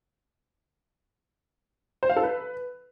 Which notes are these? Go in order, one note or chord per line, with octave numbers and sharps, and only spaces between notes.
C5
F5
A4
B4